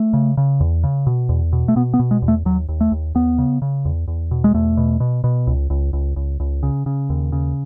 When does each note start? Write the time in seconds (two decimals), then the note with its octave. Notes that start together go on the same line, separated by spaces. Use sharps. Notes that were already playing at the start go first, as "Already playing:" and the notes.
Already playing: A3
0.13 C#3
0.37 C#3
0.60 E2
0.84 C#3
1.07 B2
1.29 E2
1.53 B2
1.68 A3
1.76 B2 B3
1.94 B3
1.99 B2
2.11 G#3
2.22 E2
2.28 A3
2.45 D#2 F#3
2.69 D#2
2.81 A3
2.92 D#2
3.15 D#2 B3
3.38 C#3
3.62 C#3
3.85 E2
4.08 E2
4.31 B2
4.44 G#3
4.54 E2 A3
4.77 B2
5.00 B2
5.24 B2
5.47 C#2
5.70 C#2
5.93 C#2
6.16 C#2
6.40 C#2
6.63 C#3
6.86 C#3
7.10 D#2
7.32 C#3